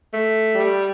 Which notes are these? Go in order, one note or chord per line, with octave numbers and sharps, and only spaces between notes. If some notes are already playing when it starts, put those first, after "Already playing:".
A3
G3